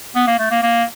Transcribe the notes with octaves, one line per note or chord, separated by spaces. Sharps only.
B3
A#3
A3
A#3
A#3